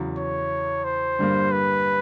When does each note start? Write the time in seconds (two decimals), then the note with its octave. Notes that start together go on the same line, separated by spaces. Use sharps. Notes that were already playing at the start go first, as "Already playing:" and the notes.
Already playing: E2 C#3 F#3
0.18 C#5
0.84 C5
1.19 G2 D3 G3 A#3
1.52 B4